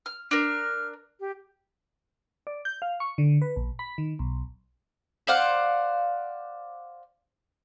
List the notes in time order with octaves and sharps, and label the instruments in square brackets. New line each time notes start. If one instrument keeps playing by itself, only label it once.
[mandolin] F6
[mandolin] D4 A#4 [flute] F6
[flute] G4
[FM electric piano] D5
G6
F5
C#6
D3
B4
A#1
B5
D#3
B1
[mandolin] C5 D5 F5 F#5